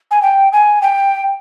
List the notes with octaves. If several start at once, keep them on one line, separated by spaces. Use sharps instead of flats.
G#5
G5
G#5
G5